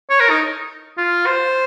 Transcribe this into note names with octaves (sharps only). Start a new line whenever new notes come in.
C#5
A#4
D#4
F4
C5